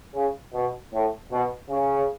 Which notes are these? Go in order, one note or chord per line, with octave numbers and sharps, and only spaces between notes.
C#3
B2
A2
B2
C#3